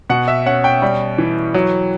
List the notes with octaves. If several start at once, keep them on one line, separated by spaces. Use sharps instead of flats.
B2 F#5
E5
C#4 F#5
G5
G3
E3
F#3